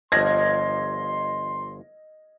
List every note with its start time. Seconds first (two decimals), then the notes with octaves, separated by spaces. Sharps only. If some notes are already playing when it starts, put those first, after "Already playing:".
0.12 G1 F3 D#5 C6 G#6 A#6